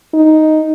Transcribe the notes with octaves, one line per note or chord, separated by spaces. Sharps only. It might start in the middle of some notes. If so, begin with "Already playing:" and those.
D#4